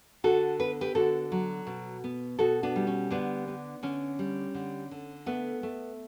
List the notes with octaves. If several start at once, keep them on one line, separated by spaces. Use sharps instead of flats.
D3 F#4 A4
B3 B4
G4 B4
D3 F#4 A4
F#3
B2
B3
B2 F#4 A4
B3 D4
G3
C#4
D3 B3 D4
B3
D3 C#4
G3
D3
D3
A3 B3
A3